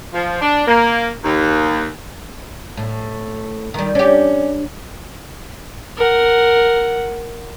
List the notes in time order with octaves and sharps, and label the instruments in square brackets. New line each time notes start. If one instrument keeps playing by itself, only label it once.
[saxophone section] F3
D4
A#3
D#2
[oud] A2
D#3 G3
[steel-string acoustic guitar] C#4 [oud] D4 G4
[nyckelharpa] A#4 F#5